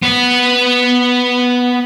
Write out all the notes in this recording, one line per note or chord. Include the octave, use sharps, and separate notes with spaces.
B3 B4